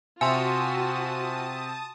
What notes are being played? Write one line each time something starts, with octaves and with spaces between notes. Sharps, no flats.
C3 F4 F#4 E5 G#5 A5 C6 D#6